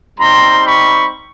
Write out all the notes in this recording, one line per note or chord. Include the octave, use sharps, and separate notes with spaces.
G3 C4 D#4 A#5 C6
B5 C#6